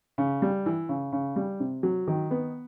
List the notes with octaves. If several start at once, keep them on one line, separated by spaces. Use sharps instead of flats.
C#3
G3
E3
C#3
C#3
G3
C3
F#3
D#3
B3